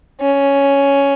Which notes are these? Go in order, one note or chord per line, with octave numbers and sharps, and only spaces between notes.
C#4